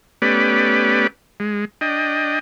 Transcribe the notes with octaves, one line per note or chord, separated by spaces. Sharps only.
A3 B3 C#4 G4 B4 D5
G#3
D4 D#5 G5